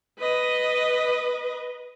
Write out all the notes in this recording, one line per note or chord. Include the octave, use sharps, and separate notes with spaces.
B4 D#5